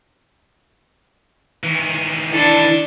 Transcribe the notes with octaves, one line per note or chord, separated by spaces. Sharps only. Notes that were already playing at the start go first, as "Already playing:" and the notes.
D#3 E3
D4 E4 A4